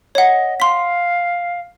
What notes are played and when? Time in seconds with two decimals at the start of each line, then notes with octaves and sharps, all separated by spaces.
0.15 C#5 D#5 F#5
0.60 F5 C6 B6